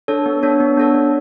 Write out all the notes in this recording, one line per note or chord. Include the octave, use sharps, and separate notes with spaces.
D4 A4 C#5
B3
D4 A4 C#5
B3
D4 A4 C#5
D4